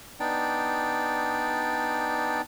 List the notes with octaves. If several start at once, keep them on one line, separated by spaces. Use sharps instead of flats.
B3 D4 D#4 D5 G5